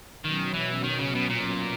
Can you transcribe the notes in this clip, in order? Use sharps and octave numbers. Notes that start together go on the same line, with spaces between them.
B2 D#3 F#3 C#4
E3
D#3
C#3
B2
A#2